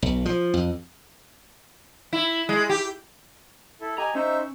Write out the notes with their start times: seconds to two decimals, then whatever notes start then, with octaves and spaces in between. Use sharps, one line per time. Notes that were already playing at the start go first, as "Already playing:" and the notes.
0.02 B1
0.25 F3
0.54 F2
2.13 E4
2.49 G#3
2.69 G4
3.81 E4 A4
3.98 G4 D#5 G#5 A#5
4.15 C#4 D#4 C5 E5